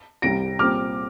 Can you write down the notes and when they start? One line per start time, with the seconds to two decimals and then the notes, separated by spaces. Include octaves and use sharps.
0.22 C2 C3 G3 A#6 D7
0.59 A#2 G3 C4 D6 F6